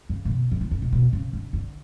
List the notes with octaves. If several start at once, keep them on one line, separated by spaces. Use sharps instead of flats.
C#3
A2
B2
E3
D3
C#3
B2
B2
C#3
D3
D3